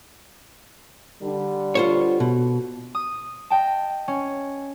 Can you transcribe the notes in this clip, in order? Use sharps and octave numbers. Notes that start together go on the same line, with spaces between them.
D3 G3
F4 C5 C#5
B2
D#6
D#5 G5 A5
C#4